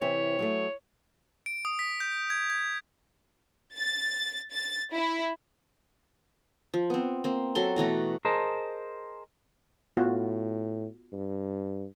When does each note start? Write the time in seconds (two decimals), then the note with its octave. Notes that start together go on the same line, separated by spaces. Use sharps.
0.01 C3 E3 C4 C#5
0.39 F#3 G#3 A3
1.46 D7
1.65 D#6
1.79 B6
2.00 G6
2.30 G#6
2.50 G#6
3.74 A6
4.51 A6
4.93 E4
6.74 F3
6.90 B3 C4
7.24 A#3 C4
7.55 F#3 A4 C6
7.76 B2 E3 A3 A#5
8.25 G#4 A#4 C5 D#5 A5
9.97 A2 B3 F4 F#4
11.13 G2